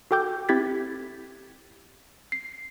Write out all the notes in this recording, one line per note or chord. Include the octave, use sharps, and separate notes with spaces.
F#4 A4 G5 D6 G6
C4 E4 G4 G#6 A6 B6
C7